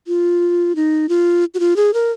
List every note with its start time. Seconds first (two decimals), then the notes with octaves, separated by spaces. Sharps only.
0.07 F4
0.76 D#4
1.09 F4
1.54 F#4
1.60 F4
1.76 G#4
1.94 A#4